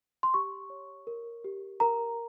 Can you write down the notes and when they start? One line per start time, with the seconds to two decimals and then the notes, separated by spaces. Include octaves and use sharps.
0.23 C6
0.34 G4 C#6
0.70 C#5
1.07 A#4
1.44 G4
1.80 A#4 A#5